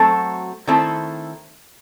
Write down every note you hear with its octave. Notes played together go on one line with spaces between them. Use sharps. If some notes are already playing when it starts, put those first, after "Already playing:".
Already playing: F#3 A3 C4 F#4 A4
D#3 A3 C4 E4 A4